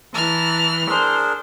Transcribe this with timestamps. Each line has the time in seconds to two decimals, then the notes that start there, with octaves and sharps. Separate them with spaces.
0.14 E3 A5 A#5 F6
0.89 D4 G#4 A#4 C5